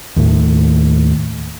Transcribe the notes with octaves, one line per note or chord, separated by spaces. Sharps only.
D#2 A2